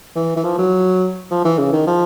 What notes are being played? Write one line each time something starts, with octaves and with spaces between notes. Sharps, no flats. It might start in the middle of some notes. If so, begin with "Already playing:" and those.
E3
E3
F3
F#3
F3
E3
C#3
D#3
F3